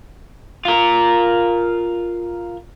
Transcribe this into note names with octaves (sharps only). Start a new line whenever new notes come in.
F4 A#4